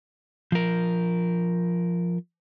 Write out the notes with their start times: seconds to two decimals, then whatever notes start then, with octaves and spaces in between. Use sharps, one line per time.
0.52 F3 A#4